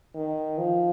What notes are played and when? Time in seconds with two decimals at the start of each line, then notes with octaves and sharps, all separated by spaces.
0.15 D#3
0.58 F3